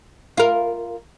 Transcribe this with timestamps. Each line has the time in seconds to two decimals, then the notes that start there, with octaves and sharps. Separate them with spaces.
0.37 F4 A#4